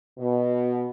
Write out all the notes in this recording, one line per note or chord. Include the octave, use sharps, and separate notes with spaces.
B2